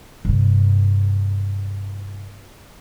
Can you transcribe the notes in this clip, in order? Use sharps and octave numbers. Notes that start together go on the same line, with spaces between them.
G2 C3